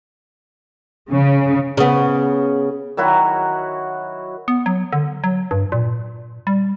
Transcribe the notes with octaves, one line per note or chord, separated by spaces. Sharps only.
C#3
C#3 B3
D#3 F#3 E4 F#4
B3
F#3
D3
F#3
G2
A#2
G3